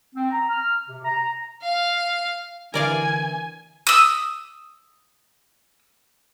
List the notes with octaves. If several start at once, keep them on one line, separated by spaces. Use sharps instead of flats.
C4
A#5
F6
C3
A#5
F5
D3 E3 A#4 D5 F5 G#5
D#6 E6